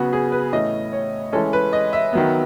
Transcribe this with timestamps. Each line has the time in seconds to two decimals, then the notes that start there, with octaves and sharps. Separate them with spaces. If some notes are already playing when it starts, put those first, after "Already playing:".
Already playing: C#3 F#3 B3 F#4
0.13 G#4
0.32 B4
0.53 A2 E3 A3 C#4 D#5
0.93 C#5
1.33 E3 G#3 C#4 A4
1.53 B4
1.73 D#5
1.93 E5
2.13 D#3 F#3 B3